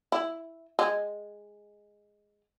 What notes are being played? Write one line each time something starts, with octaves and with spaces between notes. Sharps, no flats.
E4
G#3